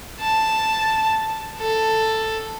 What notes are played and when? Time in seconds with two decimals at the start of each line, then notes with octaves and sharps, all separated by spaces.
0.21 A5
1.60 A4